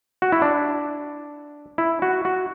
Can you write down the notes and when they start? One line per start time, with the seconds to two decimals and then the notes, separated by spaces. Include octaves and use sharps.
0.22 F#4
0.32 E4
0.42 D4
1.78 E4
2.02 F#4
2.25 F#4